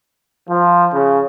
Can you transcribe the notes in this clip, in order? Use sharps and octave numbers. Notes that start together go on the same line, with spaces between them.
F3
C#3